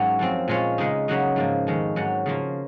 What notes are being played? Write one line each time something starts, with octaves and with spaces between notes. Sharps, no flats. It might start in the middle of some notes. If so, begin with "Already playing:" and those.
Already playing: G#2 F#3 A#3 C#4 F#4
F#2 F3 C4
A#2 G#3 C#4 F4
C#3 G#3 D#4
C#3 F#3 A#3 D#4 F#4
G#2 F3 A#3
F2 D#3 G#3 C#4
G#2 F#3 C#4
C#3 F3 A#3 F4